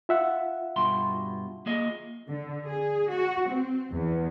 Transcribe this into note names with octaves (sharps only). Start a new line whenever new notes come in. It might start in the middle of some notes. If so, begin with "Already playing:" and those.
F4 E5 F#5
G2 B2 C6
A#3 G#4 D#5
D3
G#4
F#4
C4
E2